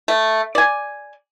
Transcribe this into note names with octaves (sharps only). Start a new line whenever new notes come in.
A3
D5 G#5